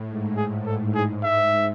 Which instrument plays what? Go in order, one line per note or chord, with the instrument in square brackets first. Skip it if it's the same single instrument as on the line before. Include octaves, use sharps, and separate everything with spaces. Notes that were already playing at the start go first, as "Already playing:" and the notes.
Already playing: [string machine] A2
G#2
[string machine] A2 [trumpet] G#4
[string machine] A2 [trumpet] A4
[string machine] G#2 [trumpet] G#4
[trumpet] E5